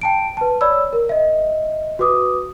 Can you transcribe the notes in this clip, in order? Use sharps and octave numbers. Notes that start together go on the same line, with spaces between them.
G5 A5 D7
B4 A5
C#5 D5 B5 E6
A#4
D#5 E5
F#4 B4 D6 D#6